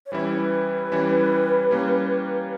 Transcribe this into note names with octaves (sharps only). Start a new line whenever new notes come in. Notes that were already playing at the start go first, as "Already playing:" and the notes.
C#5
E3 G3 C#4 E4 B4
E3 G3 C#4 E4
G3 A#3 C#4